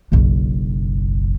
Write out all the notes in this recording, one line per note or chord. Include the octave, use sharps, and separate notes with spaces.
F#1 B1